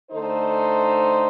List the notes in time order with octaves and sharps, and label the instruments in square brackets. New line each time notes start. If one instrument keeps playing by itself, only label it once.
[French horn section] D3 A3 D#4 A4 C5